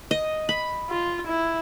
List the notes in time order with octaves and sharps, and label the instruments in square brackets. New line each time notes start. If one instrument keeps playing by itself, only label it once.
[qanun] D#5
B5
[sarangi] F4
E4